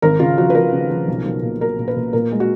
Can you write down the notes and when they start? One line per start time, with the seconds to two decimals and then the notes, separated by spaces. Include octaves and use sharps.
0.02 G#1 A#4
0.19 C#3 F4
0.38 F3 F#4
0.50 B4
0.55 F3 A#4
0.73 C#3
0.90 F3
1.08 B1
1.26 B1
1.43 A#2
1.60 F#3 A#4
1.79 A#2
1.88 B4
1.97 A#2
2.13 A#2 A#4
2.32 G#3
2.40 F#4